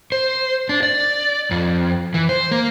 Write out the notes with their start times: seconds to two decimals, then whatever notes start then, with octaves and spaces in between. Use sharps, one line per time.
0.12 C5
0.69 D4
0.83 D5
1.51 F2
2.14 E3
2.29 C5
2.51 A#3